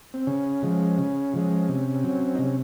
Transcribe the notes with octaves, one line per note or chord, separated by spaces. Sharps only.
C4
C#3 C#4
F3 G#3
C#3
F3 G#3
C3
F#3 C4
D#4
C3 C#4